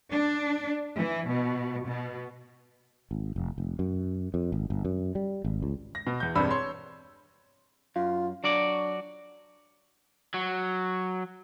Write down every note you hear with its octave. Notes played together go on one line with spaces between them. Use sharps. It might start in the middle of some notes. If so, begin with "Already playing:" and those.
D4
E3
B2
B2
G#1
F1
F1
F#2
F2
G#1
G1
F#2
G3
G#1
C#2
A#6
B2
E2 G6
E1 G2 C4 D4 B5 E6
C#5 C6
F#2 F4
F#3 D4 F#4 D5
F#3